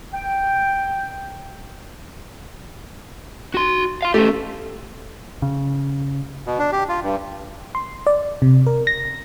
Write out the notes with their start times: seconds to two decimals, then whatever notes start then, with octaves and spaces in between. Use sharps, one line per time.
0.14 G5
3.54 F#4 C6
4.02 F5 C6
4.14 A3 C#4 G4
5.42 C#3
6.47 B2
6.59 D4
6.72 G4
6.89 F4
7.03 G2
7.75 C6
8.07 D5
8.42 C3
8.67 A#4
8.87 A#6